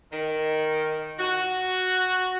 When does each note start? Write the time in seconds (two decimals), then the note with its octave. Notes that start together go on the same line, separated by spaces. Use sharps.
0.12 D#3
1.19 F#4